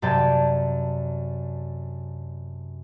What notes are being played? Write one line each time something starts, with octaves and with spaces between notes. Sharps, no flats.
F#2 C3 D5 G5 A5 G#6